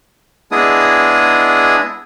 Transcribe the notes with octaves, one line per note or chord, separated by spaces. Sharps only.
G#3 B3 D4 E4 G#4 D#6